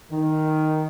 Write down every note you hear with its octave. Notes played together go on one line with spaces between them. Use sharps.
D#3